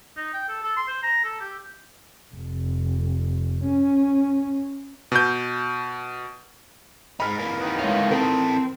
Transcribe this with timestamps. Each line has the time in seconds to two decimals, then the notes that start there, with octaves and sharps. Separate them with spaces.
0.17 D#4
0.34 G5
0.49 A4
0.63 A4
0.77 C6
0.88 C5
1.03 A#5
1.24 A4
1.40 G4
2.34 F1
3.67 C#4
5.12 B2 G6
7.20 G#3 D#4 B5 F6
7.39 E3 A#3
7.58 D#3 B3
7.79 G#3 A3 C#5 F5
8.11 E3 C4 A4 A#4